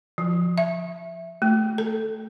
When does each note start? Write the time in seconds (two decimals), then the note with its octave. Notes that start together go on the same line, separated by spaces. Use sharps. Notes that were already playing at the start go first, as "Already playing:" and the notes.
0.18 F3
0.58 E5
1.42 A3
1.78 A4